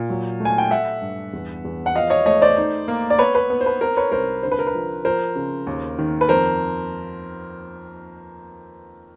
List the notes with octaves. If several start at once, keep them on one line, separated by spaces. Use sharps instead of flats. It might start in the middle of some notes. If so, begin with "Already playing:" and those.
Already playing: A#2
F#3
A3
G#5
G5
A3 E5 F#5
G2
E2
E2
F#5
F3 D#5 F5
C#5 D#5
A3 C#5 D#5
C5 D5
D#4
A#3
D5
B3 B4 C#5
B4
B3
C5
B4
C4 A#4 C5
B4 C#5
C2 A#4 C5
D3 C5
B4
A#4
B4
F3
F3 A#4 C5
C#3
D#2
D#3
B4
F2 A#4 C5